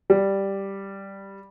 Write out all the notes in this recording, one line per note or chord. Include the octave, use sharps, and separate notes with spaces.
G3